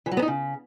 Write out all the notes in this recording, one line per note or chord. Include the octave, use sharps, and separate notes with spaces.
E3
F#3
B3
D#4
C#3